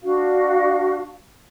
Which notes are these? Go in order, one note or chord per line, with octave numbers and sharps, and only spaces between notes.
D4 F#4 F5